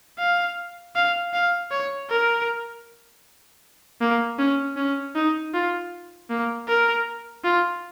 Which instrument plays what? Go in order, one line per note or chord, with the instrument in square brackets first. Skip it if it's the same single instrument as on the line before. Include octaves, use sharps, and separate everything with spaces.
[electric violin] F5
F5
F5
C#5
A#4
A#3
C#4
C#4
D#4
F4
A#3
A#4
F4